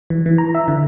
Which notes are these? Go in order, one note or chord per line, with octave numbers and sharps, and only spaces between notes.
E3
E3
A#5
E5
D3